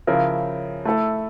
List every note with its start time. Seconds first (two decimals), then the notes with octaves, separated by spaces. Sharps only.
0.07 C#3 F3 C#4 E4 A#4
0.85 A3 E4 A4